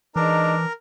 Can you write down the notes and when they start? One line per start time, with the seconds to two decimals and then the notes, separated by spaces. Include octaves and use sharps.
0.16 E3 G#3 D4 D#4 A#4 A#5